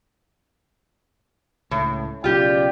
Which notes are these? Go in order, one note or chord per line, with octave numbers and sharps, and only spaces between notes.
C#2 A2
B1 C#3 F4 G4 D5 G5